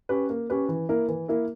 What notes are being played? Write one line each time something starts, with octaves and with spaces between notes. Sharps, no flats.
C#4 G4 B4
A#3
C#4 G4 B4
E3
A#3 E4 A#4
E3
A#3 E4 A#4